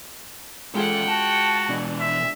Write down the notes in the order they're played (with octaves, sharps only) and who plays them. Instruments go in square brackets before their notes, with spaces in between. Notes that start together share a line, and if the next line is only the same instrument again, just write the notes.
[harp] G#3 F4 G#4 [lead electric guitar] C#4 A4 [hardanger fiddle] F#5 G5
[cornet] F#4 [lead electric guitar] A5
[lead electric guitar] B2 E3 [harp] D4
[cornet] E5